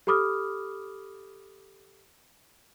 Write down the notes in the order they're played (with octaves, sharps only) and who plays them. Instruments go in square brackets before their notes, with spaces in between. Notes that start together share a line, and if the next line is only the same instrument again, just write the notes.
[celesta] G4 A4 B5 D6 D#6 F6